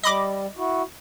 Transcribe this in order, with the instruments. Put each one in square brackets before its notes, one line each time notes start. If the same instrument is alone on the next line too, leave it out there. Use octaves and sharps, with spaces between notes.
[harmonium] G3 [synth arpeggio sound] D#5 B5 D6
[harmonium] E4 F#4